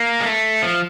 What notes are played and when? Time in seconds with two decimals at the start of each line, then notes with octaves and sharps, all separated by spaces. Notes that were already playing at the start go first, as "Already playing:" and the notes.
Already playing: A#3
0.20 G#3
0.25 A3
0.63 F3